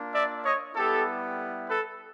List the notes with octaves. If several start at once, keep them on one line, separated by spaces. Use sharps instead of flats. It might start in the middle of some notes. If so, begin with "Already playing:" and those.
Already playing: A#3 D4 F4
D5 E5
C#5 D#5
G3 B3 E4 G4 A4
A4 B4